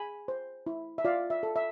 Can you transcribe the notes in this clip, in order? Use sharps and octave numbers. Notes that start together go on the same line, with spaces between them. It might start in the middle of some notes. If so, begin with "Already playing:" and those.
Already playing: G#4 G#5 B5
C5
E4
E5
F4 D5 F5
E5
A4
E5